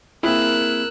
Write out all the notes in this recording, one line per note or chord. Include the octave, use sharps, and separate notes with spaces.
A#3 C4 E4 G#4 A#4 E6 F#6